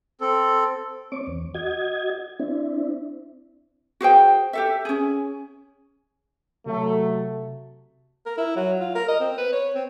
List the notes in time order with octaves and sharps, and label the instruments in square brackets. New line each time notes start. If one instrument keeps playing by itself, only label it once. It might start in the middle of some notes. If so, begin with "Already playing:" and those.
[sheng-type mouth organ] C4 A4
[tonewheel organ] C4 C#5 D6
E2
F#4 D#5 G#6
C4 D4 E4
[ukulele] F#4 G#4 C5 G5
G4 A4 E5
C#4 G#4
[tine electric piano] C3 [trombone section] F#3 A3
[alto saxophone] A#4
E4
F#3
F4
A#4
D#5
C4
B4
C#5
C4